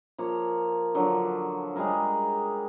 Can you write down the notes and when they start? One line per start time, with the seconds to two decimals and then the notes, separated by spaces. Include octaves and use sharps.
0.18 F3 A#3 C#5
0.94 D3 F3 F#3
1.75 G3 G#3 G#4 A#4